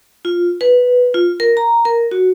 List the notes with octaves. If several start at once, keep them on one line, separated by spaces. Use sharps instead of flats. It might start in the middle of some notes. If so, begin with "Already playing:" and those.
F4
B4
F4
A#4
A#5
A#4
F#4